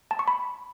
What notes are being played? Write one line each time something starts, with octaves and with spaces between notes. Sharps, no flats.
A5
C#6
B5